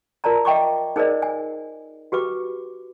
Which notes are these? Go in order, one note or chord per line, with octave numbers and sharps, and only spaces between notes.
F4 A#4 D5 A5 A#5
D#5 E5 G5 C#6 D6
D#4 G#4 A#4 C5 D5 D#5
G#5
F#4 G4 B4 D6